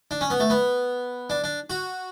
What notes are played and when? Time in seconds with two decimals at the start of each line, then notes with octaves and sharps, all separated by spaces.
0.11 D4
0.21 C#4
0.30 B3
0.40 A3
0.50 B3
1.30 D4
1.44 D4
1.70 F#4